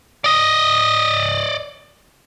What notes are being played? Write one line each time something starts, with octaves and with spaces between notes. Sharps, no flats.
D5 D#5